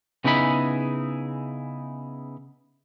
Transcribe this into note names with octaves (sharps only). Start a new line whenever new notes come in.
C#3 B3 D#4 E4 G#4 B5